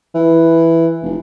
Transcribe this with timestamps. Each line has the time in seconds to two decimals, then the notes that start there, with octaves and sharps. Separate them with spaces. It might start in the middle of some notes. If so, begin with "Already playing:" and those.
0.14 E3
1.02 F1